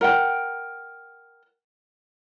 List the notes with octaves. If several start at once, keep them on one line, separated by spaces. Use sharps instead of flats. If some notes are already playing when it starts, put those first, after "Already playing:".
A#4 F#5 G5